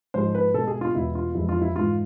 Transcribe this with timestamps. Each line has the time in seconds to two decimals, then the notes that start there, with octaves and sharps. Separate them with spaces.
0.14 G#2 F3 G#3 C5
0.34 B4
0.54 B2 G#3 A4
0.68 G#4
0.81 F4
0.95 E2 B2 G#3 E4
1.15 F4
1.35 F2 E3 G#3 E4
1.49 F4
1.61 E4
1.76 G#2 E3 G#3 F4